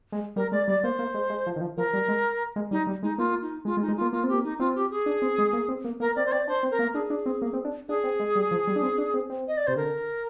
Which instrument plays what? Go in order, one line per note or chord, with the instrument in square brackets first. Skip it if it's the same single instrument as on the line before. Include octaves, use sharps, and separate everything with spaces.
[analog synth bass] G#3
[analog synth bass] G3 [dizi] A#4
[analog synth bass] G#3 [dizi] D5
[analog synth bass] G3 [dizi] D5
[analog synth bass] A#3 [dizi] C5
[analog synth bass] A#3
G#3
G#3
F3
D#3
F3
[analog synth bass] F3 [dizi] A#4
[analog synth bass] G3
G#3
G#3
[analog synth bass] G3 [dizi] D#4
[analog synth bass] G3
[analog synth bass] G#3 [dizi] D#4
[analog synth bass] A#3 [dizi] F4
[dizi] D#4
[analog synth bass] G#3 [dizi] F4
[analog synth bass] G#3
[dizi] D#4
[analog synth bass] G#3
[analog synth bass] A#3 [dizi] F4
[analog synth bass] A#3 [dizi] F4
[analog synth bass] C4 [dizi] G4
[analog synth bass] A#3
[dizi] D#4
[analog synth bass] C4 [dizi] F4
[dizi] G4
G#4
[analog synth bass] D4
C4
G#3
A#3
C4
A#3
[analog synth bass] A#3 [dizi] A#4
[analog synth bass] C4 [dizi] D5
[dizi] C5
[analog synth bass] C4 [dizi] D5
[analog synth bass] D4 [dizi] C5
[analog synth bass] C4
[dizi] A#4
[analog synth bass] A#3
[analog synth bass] D4 [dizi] G#4
[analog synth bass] D4
C4
A#3
C4
D4
[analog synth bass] D4 [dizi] G#4
[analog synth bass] C4
G#3
G3
F3
G3
D4
C4
D4
C4
C4
[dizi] D#5
D5
[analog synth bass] C3 [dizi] C5
[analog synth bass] D3 [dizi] A#4